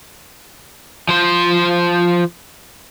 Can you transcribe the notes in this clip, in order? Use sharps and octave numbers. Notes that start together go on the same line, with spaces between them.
F3 C5